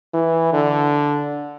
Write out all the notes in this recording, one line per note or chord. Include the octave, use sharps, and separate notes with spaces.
E3
D3